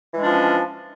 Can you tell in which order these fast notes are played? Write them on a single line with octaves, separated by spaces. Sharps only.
E3 G#3 D4 F3 C#4